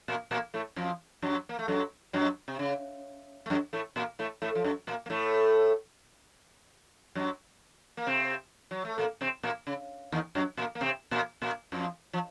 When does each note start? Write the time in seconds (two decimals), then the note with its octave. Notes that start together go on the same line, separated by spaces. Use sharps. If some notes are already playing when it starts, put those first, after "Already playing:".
0.08 A#2 A#3
0.31 A#2 A#3
0.54 A2 A3
0.76 F2 F3
1.22 F#2 F#3
1.49 A#3
1.59 A3
1.68 F#2 F#3
2.13 F#2 F#3
2.48 C3
2.59 C#3
3.46 A3
3.50 F#2 F#3
3.73 A2 A3
3.96 A#2 A#3
4.19 A2 A3
4.42 A2 A3
4.55 F3
4.64 F#2 F#3
4.87 A#2 A#3
5.06 A#3
5.10 A2 A3
7.15 F#2 F#3
7.97 A#3
8.07 C3 C4
8.71 F#3
8.85 A3
8.98 A#2 A#3
9.21 C3 C4
9.43 A#2 A#3
9.67 C#3
10.12 D#2 D#3
10.35 F#2 F#3
10.57 A#2 A#3
10.75 A#3
10.81 C3 C4
11.11 A#2 A#3
11.42 A#2 A#3
11.72 F2 F3
12.13 F3